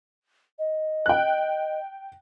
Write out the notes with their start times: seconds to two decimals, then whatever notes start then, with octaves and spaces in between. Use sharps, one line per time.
0.59 D#5
1.06 G5 F#6